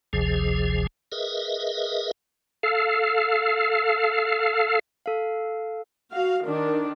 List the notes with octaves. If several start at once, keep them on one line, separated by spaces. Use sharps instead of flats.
G#1 D2 C3 F3 G#4
G#4 A#4 B4 D#5 E5
A4 F5
A4 F5
F#4 F5
D#3 D4